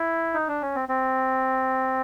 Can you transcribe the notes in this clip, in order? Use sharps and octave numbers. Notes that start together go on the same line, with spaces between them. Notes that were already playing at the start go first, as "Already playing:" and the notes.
Already playing: E4
D#4
D4
C#4
C4
C4